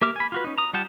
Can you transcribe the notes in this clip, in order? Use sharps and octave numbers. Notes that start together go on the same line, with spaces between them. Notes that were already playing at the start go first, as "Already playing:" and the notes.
A#3 G4 E5 D6 F6
G#5 B5
F4 F#4 B4
C#4 D#4
A#5 D#6
G3 F4 F#5 G5 A5